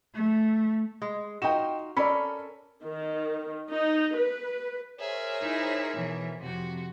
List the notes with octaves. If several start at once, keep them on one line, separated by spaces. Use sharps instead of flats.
A3
G#3
D#4 F4 F#4 G5 E7
C#4 A4 A#4 D5 B5
D#3
D#4
B4
G#4 A#4 C5 C#5 E5
D#4 E4
B2 E3
F2 C3 F#4